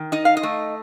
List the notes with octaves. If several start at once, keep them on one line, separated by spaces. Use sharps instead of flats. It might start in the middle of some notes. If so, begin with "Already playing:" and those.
Already playing: D#3
D#4 D#5
F5
D#5
A3